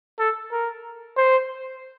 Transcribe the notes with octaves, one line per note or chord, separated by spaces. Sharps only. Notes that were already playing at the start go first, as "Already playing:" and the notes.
A4
A#4
C5